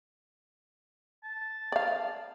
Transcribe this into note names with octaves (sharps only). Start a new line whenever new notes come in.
A5
D5 F5